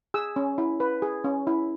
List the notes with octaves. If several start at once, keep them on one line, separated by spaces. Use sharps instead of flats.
G#4 E6
C#4
E4
B4
G#4
C#4
E4